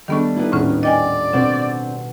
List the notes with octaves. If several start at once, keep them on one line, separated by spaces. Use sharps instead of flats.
D#3 G3 A3 B3 D4 C#6
B3 D#4 E4
D#1 A2 C#4 F6
D5 D#5 G5 G#5
B2 C4 D4 C5 A6 E7